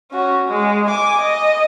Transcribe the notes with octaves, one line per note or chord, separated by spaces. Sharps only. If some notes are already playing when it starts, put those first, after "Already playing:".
C#4 F#4
G#3
G#5 D6
D#5